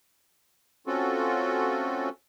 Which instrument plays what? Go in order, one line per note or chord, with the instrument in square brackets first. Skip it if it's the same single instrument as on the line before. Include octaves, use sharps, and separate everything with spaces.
[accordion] A3 C4 C#4 F4 F#4 A4